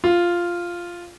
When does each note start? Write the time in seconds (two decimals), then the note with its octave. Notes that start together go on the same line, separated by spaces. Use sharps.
0.04 F4